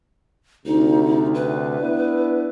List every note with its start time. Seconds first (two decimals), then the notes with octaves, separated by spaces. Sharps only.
0.66 D2 C3 D#4
1.35 B4
1.81 B3 D4 E4